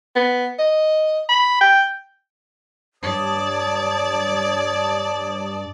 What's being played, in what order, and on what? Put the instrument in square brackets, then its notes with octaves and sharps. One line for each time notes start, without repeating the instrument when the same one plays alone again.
[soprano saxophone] B3
D#5
B5
G5
[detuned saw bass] G2 [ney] C#5 [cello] D5 [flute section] A5 D#6